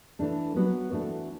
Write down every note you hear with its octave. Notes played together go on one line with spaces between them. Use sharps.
E3 A3 D4 A4
F#3 B3 D4 F#4 B4
E3 A3 D4 F#4